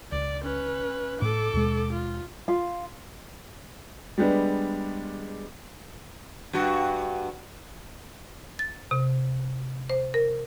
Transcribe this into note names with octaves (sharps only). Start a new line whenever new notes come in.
C#2 D5
C#4 B4
A2 A4 D6
D#2 B2 G#3
F4
F4
G3 G#3 B3 D4
G2 F#4
A6
C3
C5
A#4